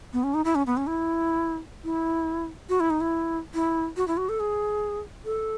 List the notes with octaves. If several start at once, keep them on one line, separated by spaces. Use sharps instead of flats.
B3
C#4
D#4
E4
C#4
B3
C#4
E4
E4
F#4
E4
D#4
E4
E4
F#4
E4
F#4
A4
G#4
A4